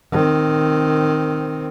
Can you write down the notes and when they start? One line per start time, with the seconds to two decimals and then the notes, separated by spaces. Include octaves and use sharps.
0.12 D#3 C4